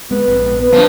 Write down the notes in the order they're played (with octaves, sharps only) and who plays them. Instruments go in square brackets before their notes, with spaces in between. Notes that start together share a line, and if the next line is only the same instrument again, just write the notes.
[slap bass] G#3 C4 [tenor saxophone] B3
[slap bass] A#1 G#2 C4
[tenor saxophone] B3 [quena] B4
[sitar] G2 F3 [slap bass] F#3 [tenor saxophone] B3